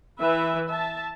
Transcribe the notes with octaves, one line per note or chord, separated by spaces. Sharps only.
E3 B4 E5
E5 A5